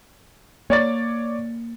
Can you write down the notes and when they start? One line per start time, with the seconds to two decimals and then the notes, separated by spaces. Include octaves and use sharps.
0.70 A#3 C#5 D5 A6